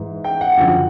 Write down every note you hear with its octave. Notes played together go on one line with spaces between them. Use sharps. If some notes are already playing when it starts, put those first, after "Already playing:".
Already playing: G#2 E3
G5
F#5
F#2 D3 F3